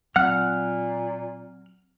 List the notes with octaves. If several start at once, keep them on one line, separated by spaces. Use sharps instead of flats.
A#2 F#3 C4 F#5 F6 F#6